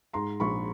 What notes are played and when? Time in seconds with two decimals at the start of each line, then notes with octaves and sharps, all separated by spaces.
0.13 G#2 A#5 C6
0.40 A#1 B5 C#6